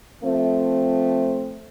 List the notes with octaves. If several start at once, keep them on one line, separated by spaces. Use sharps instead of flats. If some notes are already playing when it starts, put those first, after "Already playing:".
F3 A3 C4